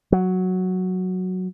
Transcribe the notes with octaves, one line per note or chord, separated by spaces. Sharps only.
F#3